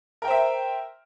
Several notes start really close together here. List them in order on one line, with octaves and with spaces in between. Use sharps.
A#4 G5 C5 E5